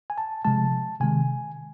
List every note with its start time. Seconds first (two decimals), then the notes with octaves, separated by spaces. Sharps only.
0.10 G#5
0.18 A5
0.45 C3 F3 G#3 A5
1.00 C3 D#3 G#3 G#5